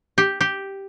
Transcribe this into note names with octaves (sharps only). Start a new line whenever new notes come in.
G4
G4